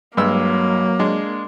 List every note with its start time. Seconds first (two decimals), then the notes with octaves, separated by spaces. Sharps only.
0.17 G2 F#3 G#3 A#3 E6
0.99 G#3 D4